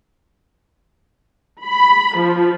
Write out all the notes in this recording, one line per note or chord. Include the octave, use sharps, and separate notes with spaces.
B5
F3